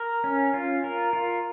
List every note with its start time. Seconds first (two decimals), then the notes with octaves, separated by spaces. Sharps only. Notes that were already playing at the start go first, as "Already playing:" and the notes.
Already playing: A#4
0.24 C#4
0.54 F4
0.84 A#4
1.13 F4